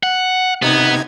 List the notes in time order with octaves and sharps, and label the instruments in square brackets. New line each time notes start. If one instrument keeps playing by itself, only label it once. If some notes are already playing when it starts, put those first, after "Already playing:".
[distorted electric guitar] F#5
[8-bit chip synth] C3 D#4 G#6 [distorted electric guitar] B3